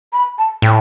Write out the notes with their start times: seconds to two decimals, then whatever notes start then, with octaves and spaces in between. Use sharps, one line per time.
0.13 B5
0.38 A5
0.62 A2 G5